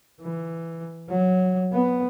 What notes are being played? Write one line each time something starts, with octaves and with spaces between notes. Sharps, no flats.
E3
F#3
B3